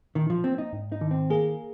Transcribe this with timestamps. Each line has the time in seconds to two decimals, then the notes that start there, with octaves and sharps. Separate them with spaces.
0.15 A#2 D#3
0.30 F3
0.44 A#3 C4
0.58 D#4
0.73 G#2
0.92 D#4
1.01 D#3
1.11 C4
1.30 A#3 G#4